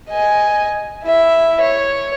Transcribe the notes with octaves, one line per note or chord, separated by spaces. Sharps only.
D#5 G#5
E4 E5
C#5